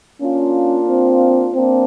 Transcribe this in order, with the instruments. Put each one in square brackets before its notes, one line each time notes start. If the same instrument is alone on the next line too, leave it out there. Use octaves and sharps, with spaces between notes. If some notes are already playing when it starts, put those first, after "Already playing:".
[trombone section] A#3 D4 F4 [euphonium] C#4
[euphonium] C4
[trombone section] A#3 D4 [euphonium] C4